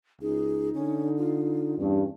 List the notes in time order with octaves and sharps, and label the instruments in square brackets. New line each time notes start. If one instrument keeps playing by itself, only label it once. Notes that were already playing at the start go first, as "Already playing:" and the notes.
[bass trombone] C#2 [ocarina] D#4 [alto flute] G#4
[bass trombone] D3 [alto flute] C#4
[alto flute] F4
[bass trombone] E2 [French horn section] G2 [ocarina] C#4